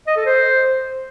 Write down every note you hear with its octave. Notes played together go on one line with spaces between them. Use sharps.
D#5
A4
C5